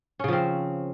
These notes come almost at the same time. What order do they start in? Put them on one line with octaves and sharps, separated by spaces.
C#4 C#3 F3 C4